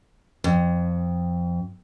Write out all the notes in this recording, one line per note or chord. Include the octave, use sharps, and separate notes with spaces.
F2